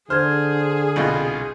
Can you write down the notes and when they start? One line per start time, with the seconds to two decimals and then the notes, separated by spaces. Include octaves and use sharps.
0.10 D3 G#4 C5 F6 G#6
0.96 C2 B2 F4